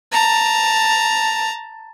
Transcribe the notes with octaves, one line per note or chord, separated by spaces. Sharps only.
A5 A#5